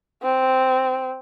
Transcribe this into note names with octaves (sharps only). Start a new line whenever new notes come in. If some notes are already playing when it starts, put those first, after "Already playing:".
C4